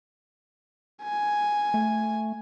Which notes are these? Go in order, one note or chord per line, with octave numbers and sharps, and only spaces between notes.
G#5
A3